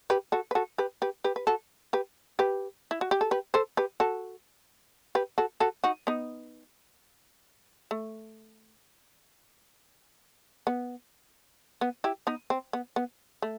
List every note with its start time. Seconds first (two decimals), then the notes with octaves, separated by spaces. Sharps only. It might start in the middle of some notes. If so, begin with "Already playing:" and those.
0.10 G4 B4
0.32 F#4 A4
0.51 B4
0.55 F#4 A4
0.78 G4 B4
1.02 G4 B4
1.24 G4 B4
1.36 B4
1.47 F#4 A4
1.93 G4 B4
2.39 G4 B4
2.91 E4
3.01 F#4
3.11 G4
3.21 A4
3.31 G4 B4
3.54 A4 C5
3.77 G4 B4
4.00 F#4 A4
5.15 G4 B4
5.38 F#4 A4
5.60 F#4 A4
5.84 D#4 F#4
6.07 B3 D#4
7.91 A3
10.67 B3
11.81 B3
12.04 E4 G4
12.27 B3 D#4
12.50 C4
12.73 B3
12.96 B3
13.42 A3